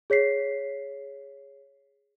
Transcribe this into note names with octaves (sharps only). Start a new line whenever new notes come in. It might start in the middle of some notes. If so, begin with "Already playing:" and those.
G#4 C#5 B6 C7